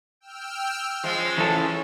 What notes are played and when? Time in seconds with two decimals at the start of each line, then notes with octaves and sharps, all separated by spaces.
0.21 G5 E6 F6
1.04 F3 G#3 C#4
1.38 E3 A4